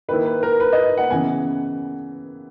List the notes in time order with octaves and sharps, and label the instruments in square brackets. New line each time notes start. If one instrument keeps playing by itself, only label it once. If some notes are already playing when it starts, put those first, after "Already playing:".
[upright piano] D#3 A#3 E4 B4
B4
A#4
B4
D#5
F#5
C#3 E3 B3 G#5